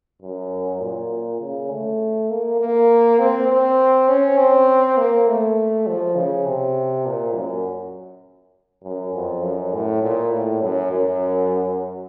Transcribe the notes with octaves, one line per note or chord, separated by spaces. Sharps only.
F#2
A#2
C#3
A3
A#3
A#3
C4
C4
C#4
C4
A#3
A3
F3
C#3
C3
A#2
F#2
F#2
F2
F#2
A2
A#2
A2
F#2
F#2